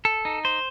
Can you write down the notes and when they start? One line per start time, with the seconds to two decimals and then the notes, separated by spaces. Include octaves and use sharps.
0.05 A4
0.25 D#4
0.45 C5